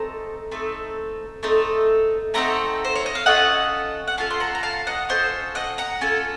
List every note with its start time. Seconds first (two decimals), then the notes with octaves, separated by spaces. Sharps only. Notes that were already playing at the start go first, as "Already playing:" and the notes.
Already playing: A3 C4 D#4 A4 A#5
0.51 A3 C4 D#4 A4
1.43 A3 C4 D#4 A4
2.34 A3 C4 D#4 A4 F#5 A#5
2.85 C5
2.95 C#5
3.06 D#5
3.15 F5
3.26 C#4 F4 A4 D#5 F#5
4.07 F#5
4.18 C#4 F4 A4 F5 A5
4.30 C6
4.40 F#5 A#5
4.55 A#5
4.63 F5 A5
4.87 D#5 F#5
5.09 C#4 F4 A4 C5 D#5
5.55 D#5 F#5
5.78 F#5 A#5
6.01 C#4 F4 A4